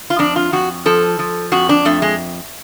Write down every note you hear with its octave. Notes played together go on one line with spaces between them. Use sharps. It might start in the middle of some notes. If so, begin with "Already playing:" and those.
F4
F2 D4
F4
F2 F#4
F3 A4
F3
F2 F#4
D4
F2 A3
G#3